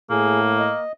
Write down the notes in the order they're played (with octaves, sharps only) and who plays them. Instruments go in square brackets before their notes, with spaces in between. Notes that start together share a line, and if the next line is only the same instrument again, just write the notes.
[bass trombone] A2 [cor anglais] A#3 [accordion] G#4
[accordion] D#5